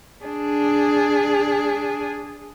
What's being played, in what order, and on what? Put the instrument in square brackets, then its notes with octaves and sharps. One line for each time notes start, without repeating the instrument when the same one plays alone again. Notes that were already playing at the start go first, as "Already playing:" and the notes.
[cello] D4 G#4